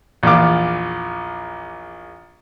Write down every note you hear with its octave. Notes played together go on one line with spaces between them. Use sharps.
A#1 E2 F4 D6